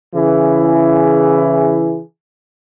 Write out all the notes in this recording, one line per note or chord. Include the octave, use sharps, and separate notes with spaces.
C#3 E3 E4 G#4